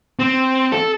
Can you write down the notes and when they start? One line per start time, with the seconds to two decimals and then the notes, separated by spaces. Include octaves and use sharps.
0.19 C4
0.72 A4